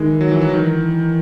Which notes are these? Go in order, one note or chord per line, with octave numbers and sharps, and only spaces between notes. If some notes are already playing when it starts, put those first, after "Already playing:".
Already playing: D#3 E3 G#3
F#3
E3
F#3
D#3 E3